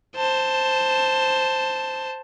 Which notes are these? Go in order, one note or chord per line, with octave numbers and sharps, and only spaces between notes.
C5 A5